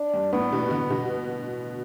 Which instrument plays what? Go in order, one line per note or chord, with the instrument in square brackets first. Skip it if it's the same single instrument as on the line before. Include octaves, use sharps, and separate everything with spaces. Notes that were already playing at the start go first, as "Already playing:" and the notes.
Already playing: [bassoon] D4
[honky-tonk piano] G2
[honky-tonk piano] A2 [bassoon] B3
[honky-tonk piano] B2
D3
B2